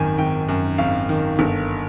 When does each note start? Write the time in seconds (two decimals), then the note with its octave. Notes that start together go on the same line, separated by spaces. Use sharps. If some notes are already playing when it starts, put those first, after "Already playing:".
Already playing: G#1 F#2 D#3 G#5
0.18 G#1 G5
0.49 F#2
0.78 G#1 F5
1.09 D#3
1.39 G1